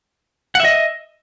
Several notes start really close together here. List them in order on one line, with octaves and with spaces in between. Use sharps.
F#5 E5 D#5